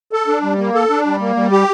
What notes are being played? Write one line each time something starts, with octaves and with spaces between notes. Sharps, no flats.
A4
D4
G3
A#3
A4
D4
G3
A#3
G3
G4